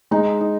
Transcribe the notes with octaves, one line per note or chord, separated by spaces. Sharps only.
G#3 D#4
D#4